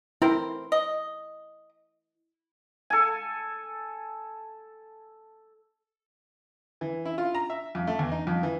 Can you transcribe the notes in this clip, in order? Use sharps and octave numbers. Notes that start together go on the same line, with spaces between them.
C4 E4 A#4 C5
D#5
A4 G#5
E3
E4
F4
A#5
E5
F2
A3
E2
D#4
F2
E3